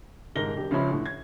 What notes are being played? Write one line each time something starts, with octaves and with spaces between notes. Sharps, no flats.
D#1 G#2 A#4 A#6 G7
E1 G4
C#2 F3 C#4 E5 B5
A2 D3
G#6